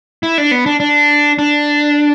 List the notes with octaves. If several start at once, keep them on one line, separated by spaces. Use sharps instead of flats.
E4
D4
B3
D4
D4
D4